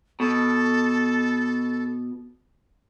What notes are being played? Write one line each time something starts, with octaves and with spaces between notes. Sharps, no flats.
B2 A4